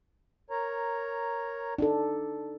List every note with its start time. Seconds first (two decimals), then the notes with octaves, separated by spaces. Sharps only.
0.50 A#4 C#5 A#5
1.78 D4 D#4 A4